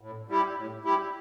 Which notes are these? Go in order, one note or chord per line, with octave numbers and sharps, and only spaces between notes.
A2
G3 E4 G4
A2
G3 E4 G4